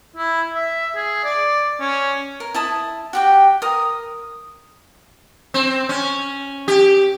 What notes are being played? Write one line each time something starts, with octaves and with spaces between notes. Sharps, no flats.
E4
E5
G#4
D5
C#4
A#4
E4 A5 D#6
F#4 G4 G5
A#4 D#6
C4
C#4
G4